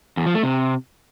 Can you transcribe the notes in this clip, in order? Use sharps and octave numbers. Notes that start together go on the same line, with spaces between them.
E2
F3
A3
C3